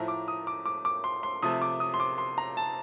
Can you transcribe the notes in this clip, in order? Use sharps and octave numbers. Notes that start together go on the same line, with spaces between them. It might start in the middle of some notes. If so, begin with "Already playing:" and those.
Already playing: A2 F3 A3 A#5
D6
D#6
D6
D6
D6
C6
C6
C3 F3 A3 D#6
D6
D#6
C6
D6
C6
A#5
A5